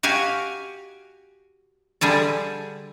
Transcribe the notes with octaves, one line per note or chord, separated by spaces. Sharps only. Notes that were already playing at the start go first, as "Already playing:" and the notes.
F#4 G4 F5 G#5
D3 G3 G#4 A4